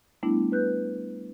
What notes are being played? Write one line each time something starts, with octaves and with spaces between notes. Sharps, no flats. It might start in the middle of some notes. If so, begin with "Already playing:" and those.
G3 A3 B3 D4 E4
B4 F#6 G6